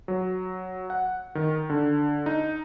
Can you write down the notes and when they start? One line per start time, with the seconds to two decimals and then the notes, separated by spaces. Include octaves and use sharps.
0.08 F#3
0.90 F#5
1.35 D#3
1.70 D3
2.26 D#4